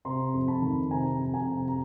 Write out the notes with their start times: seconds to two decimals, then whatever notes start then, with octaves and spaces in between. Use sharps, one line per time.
0.05 C3 A#5 C6
0.34 F2
0.48 A5 B5
0.62 D#3
0.91 C3 G#5 A#5
1.19 F2
1.34 G#5 A#5
1.48 C3
1.68 A#5